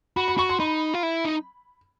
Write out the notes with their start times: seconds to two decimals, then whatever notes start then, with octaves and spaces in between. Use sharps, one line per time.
0.16 F#4 B5
0.28 B5
0.38 F#4 C#6
0.49 C6
0.60 D#4 B5
0.94 F4
1.03 E4
1.25 D#4